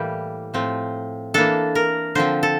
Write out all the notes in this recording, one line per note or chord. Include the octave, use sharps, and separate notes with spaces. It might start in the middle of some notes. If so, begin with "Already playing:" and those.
Already playing: A2 E3 G3 A#3 G4
A2 F3 C4
E3 A#3 D4 A4
A#4
D3 F3 C4 C5
A4